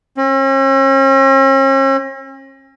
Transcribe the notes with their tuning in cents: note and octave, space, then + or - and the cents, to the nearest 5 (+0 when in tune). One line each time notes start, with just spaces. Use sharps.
C#4 -45